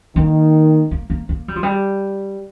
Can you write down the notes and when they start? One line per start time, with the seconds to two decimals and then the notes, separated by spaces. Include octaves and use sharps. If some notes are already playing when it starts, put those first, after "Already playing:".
0.16 D#3 A#3
0.91 A#3
1.10 A#3
1.29 A#3
1.48 G3
1.56 F3
1.63 G3